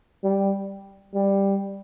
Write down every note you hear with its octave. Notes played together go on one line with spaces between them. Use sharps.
G3
G3